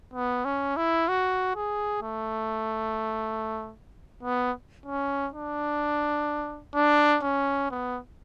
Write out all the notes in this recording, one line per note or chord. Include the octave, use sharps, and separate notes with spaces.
B3
C#4
E4
F#4
G#4
A3
B3
C#4
D4
D4
C#4
B3